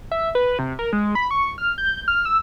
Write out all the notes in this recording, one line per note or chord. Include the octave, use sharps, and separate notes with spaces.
E5
B4
C3
A#4
G#3
B5
C#6
F6
G6
F6
E6